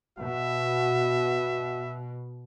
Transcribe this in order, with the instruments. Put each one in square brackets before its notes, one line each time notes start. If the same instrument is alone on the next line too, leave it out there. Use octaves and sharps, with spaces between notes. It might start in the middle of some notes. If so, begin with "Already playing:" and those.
[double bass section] B2 [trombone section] F#4 [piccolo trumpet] E5